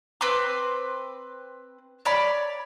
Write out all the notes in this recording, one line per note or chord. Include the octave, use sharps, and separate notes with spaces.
C4 B4 C6 D6
C#5 D5 B5